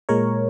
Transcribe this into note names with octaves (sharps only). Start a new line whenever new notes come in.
A#2 G#3 A#4 C#5